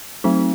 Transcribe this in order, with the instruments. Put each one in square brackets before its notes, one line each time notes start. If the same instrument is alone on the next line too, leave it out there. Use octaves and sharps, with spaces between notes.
[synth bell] F#3 A3 C4 D#4